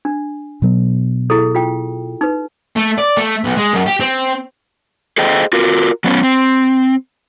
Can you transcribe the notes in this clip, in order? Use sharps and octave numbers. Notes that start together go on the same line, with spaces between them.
D4
B2 F#3 B3
E4 G#4 A4
F4 G5
D#4 B4
A3
D5
A3
B1
G#3
F#2
G4
C4
G#4 A4 C5 D#5 G5
F4 F#4 A#4
F#3 B3 C#4
C4